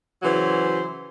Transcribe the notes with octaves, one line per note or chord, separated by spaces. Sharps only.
C#3 E3 F#3 C5